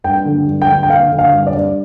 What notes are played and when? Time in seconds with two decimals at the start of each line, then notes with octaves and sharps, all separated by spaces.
0.04 G2 G5
0.25 D3
0.47 G2
0.62 G5
0.68 D3
0.83 G5
0.90 D3 F5
1.12 D3
1.19 F5
1.33 G2
1.47 D5
1.54 G2